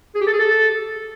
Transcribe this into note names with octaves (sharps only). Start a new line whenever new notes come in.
G#4
G4
A4
G#4
A4